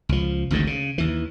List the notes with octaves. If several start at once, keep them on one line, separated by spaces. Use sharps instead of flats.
C#2 F3
G#1 D2 G#2 D#3
C#3
D#2 E3